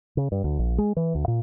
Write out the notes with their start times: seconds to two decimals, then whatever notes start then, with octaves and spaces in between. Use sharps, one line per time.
0.17 C#3
0.32 G2
0.44 D2
0.59 A#1
0.78 G#3
0.97 E3
1.15 D2
1.28 A#2